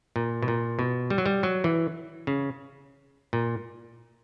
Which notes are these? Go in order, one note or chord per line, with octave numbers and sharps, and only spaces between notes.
A#2
B2
A#2
B2
G3
F#3
G3
F#3
E3
C#3
A#2